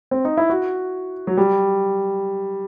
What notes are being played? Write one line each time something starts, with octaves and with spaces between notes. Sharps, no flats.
C4
D#4
E4
F#4
F#3
G3